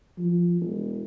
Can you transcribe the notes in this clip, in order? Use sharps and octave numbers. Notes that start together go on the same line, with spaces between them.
F3
E1